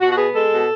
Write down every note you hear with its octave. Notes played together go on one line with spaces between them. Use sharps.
B2 F#4
F#4
B3 G#4
G#3 A4
B2